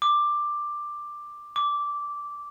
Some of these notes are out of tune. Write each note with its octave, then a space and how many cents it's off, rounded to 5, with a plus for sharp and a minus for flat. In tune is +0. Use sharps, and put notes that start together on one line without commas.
D6 +10
D6 -10